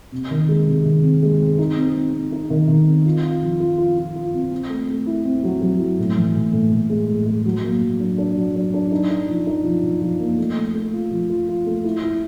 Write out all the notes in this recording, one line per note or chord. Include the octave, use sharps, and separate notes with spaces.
C3
D#3
G#3
C3
D#3
C4
G#3
C4
D#4
C4
C4
C4
D#4
D#3
D#3
C4
F4
F4
F3
F4
F4
F4
F4
C4
C4
A3
A3
E4
C4
F#3
F#3
E4
A2
E3
A2
A2
A2
G#3
A2
G#3
F#3
A#3
F#3
D4
D4
F#3
D4
D4
D#4
D#4
F3
D#4
F3
F3
F3
A#3
A3
A3
A3
F4
F3
F4
F4
A3
E4
E4